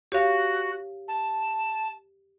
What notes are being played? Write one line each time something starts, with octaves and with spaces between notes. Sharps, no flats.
F#4 G4 C#5 F5
A5